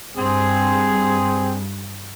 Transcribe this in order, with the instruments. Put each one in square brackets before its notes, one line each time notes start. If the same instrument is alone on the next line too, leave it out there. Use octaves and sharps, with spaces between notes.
[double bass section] G2 [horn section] C4 G#4